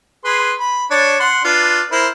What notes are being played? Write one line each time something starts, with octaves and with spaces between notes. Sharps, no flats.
G#4 B4 C6
B5
D4 C#5
F#5 C6
D4 F4 B4
E4 A#4 C5